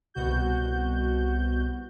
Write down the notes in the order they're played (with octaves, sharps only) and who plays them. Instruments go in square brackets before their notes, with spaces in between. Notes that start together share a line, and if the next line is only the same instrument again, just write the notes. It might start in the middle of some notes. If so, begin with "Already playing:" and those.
[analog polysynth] C2 B2 F#4 G6